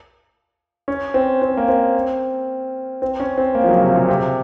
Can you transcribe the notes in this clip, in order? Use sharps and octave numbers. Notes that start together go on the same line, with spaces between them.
C#4
C4
C4
A#3
C4
C4
C#4
C4
A#3
F3
F#3
C#3
C3
A#2
C3